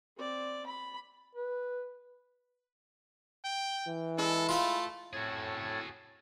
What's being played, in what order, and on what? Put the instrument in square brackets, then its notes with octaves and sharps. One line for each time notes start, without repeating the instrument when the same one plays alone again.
[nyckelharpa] C4 D5
B5
[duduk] B4
[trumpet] G5
[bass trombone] E3
[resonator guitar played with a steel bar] G#3 E4 [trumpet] A4
[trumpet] A3 [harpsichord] F4 F5
[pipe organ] A2 G#6 A6 [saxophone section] A3 C4 C#5 [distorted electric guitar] F#4 G#4